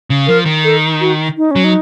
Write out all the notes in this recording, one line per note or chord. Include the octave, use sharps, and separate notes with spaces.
C#3
F3 A#4
D#3
A4
F#4
D#4
F#3 C#4
D#4